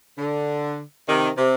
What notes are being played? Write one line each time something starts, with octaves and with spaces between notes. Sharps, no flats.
D3
C3 D#3
C3